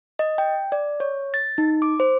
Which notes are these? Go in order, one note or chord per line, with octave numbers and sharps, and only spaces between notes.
D#5
G5
D5
C#5
A6
D#4
D6
C5